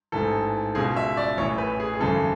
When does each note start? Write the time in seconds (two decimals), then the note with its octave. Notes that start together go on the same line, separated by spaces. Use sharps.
0.12 A1 G#2 E3 A4
0.75 C#2 B2 G#4
0.96 E5
1.17 D5
1.37 A1 A2 E3 C#5
1.58 B4
1.80 G#4
1.94 G#4
1.99 G#1 F#2 C#3 E3 A4